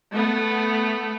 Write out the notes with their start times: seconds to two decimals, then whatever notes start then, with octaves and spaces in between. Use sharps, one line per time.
0.12 A3 B3